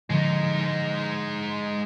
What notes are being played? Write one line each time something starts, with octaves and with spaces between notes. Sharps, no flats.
A2 D3 F3 G#3 D#4